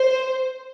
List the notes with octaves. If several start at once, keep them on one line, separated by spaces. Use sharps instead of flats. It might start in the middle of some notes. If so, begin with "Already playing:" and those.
Already playing: C5